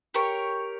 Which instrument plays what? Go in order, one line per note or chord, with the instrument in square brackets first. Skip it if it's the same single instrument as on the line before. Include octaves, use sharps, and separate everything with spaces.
[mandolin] G4 A#4 C#5